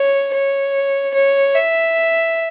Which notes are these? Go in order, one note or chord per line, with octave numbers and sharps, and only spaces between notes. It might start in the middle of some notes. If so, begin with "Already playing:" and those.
Already playing: C#5
C#5
C#5
E5